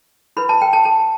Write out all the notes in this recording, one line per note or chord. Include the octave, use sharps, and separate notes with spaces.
E4 B4 B5
A5
G5
A5
A5